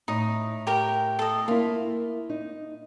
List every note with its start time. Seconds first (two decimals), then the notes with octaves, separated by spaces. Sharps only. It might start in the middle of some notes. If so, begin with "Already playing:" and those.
0.08 A2 D#4
0.67 G4 A#4 G5
1.19 A4 D#5
1.48 A#3 E4 F4
2.29 D#4